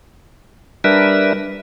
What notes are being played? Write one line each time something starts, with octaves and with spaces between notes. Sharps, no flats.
G3 D4 A#4 B4 E5